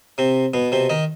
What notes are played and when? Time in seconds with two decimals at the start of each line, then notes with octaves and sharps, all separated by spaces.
0.18 C3 C4
0.54 B2 B3
0.72 C3 C4
0.90 D#3 D#4